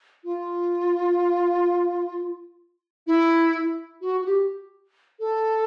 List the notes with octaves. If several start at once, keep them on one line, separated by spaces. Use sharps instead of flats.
F4
E4
F#4
F#4
G4
A4